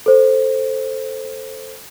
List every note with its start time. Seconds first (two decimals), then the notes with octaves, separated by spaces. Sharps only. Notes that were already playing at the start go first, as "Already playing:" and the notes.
0.06 A4 C5